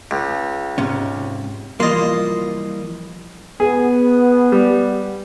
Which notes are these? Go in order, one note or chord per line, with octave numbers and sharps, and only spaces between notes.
C#2
G#2 C3 C#4
E3 F3 G3 A#3 F4 D#5 C6
B3 G#4
G3